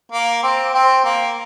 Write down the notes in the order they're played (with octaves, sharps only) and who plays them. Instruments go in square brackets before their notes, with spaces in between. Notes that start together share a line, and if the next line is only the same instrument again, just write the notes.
[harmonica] A#3
C4
C4
A#3